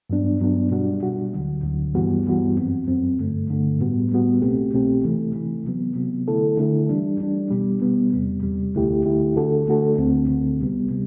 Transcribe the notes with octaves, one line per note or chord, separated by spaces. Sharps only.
G2 F#3 B3 D4
G2 F#3 B3 D4
B2 G3 D4 F#4
B2 G3 D4 F#4
D2 D3 F#3
D2 D3 F#3
G2 E3 G3 B3 F#4
G2 E3 G3 B3 F#4
F#2 F#3 C4
F#2 F#3 C4
G2 D3 A3
G2 D3 A3
A2 G3 B3 F#4
A2 G3 B3 F#4
C2 B2 A3 C4 G4
C2 B2 A3 C4 G4
C3 E3 A3
C3 E3 A3
C3 F#3 B3
C3 F#3 B3
D3 A3 E4 A4
D3 A3 E4 A4
E3 G3 D4
E3 G3 D4
B2 G3 B3
B2 G3 B3
E2 C3 G3
E2 C3 G3
D2 D3 A3 E4 G4
D2 D3 A3 E4 G4
D3 A3 D4 F#4 A4
D3 A3 D4 F#4 A4
D2 D3 A3 C4
D2 D3 A3 C4
C2 C3 G3 B3
C3 G3